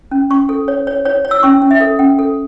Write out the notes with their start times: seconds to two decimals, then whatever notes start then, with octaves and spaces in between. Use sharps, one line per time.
0.11 C#4
0.30 C#4 C#6
0.49 A4
0.68 C#5
0.87 C#5
1.05 C#5
1.25 C#5
1.31 E6
1.43 C#4 C#6
1.62 C#4
1.71 E5
1.81 A4
1.99 C#4 F#5
2.19 A4